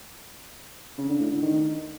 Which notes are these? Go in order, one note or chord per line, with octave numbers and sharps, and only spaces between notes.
C#3
D3
A2
D3
D#3